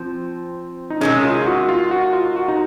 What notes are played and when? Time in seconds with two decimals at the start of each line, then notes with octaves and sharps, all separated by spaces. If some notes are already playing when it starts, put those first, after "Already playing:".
Already playing: F3 C4
0.90 D#4
1.01 C3 D#3 G#3 C#4
1.24 F4
1.41 F4
1.46 F#4
1.69 F4
1.91 F#4
2.13 F4
2.36 F#4
2.48 D#4